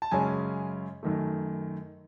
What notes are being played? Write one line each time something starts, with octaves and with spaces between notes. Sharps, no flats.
A5
F#2 C#3 G#3 C#4 G#5
F#2 D#3 A3